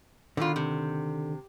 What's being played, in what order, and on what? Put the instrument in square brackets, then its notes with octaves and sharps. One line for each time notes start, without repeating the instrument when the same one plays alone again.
[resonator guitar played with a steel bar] B2 F4 [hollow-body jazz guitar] D3 D#3
[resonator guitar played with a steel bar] C3